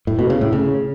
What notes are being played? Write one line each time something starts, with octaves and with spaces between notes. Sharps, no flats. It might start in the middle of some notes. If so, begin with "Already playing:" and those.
A2
B2
C#3
A2
C#3